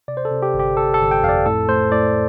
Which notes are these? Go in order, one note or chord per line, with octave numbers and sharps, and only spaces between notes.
C3 D5
C5
A4
C3
G4
G1
G4
C3 A4
A4
G1
G5
F2 F5
D5
A2 A4
A3 C5
A2 D5